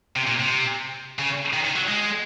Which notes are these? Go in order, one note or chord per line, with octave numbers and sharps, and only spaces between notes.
C3
A#2
C3
C#3
D#3
D#3
F#3
G#3